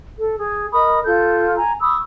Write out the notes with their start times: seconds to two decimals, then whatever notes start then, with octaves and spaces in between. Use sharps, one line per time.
0.20 A4
0.37 G#4
0.73 A#4 D#5 B5 D#6
1.04 F4 A4 G6
1.56 G#5 A#5
1.81 B5 C#6 D#6 E6